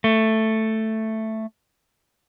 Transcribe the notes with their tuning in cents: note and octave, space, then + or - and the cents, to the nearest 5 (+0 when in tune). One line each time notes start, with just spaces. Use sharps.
A3 +5